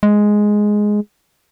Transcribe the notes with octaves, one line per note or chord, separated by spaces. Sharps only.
G#3